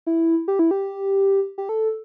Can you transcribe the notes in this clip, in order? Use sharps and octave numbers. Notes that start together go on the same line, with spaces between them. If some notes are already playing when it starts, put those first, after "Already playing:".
E4
G4
E4
G4
G4
A4